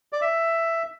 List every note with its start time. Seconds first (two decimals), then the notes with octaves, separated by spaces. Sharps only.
0.12 D5
0.21 E5